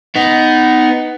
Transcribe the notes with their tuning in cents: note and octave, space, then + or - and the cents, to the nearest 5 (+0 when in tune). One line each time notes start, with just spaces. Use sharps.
B3 +15 D#4 +0